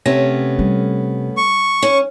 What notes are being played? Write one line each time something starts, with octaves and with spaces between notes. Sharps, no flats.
C3 A3 B3 C#4 A#6
G3
C#6
C#4